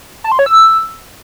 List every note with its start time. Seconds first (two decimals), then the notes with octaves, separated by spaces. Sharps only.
0.24 A5
0.32 C6
0.39 C#5
0.46 E6